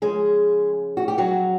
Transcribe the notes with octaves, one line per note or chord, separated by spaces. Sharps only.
C#3 F3 G#3 G#4
F#4
G4
F#3 F#4